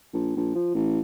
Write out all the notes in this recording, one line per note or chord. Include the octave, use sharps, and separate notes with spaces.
A#1
A#1
F3
A1